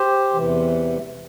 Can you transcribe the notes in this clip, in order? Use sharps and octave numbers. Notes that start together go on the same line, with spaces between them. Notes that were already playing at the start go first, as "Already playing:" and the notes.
Already playing: G4 C5
E2 C3 E3